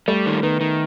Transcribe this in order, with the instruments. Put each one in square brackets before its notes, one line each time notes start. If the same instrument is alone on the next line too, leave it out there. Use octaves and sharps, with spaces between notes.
[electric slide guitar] G3 [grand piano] A3
[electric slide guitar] D#3
[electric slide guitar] D#3 [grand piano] B3
[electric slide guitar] D#3